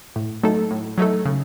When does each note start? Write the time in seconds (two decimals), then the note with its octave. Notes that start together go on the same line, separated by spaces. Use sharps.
0.16 A2
0.43 F#3 A3 D#4 A4
0.71 A2
0.98 F#3 A3 D#4 A4
1.25 C#3